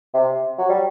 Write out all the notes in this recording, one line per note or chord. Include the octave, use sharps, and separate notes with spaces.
C3
F#3
G3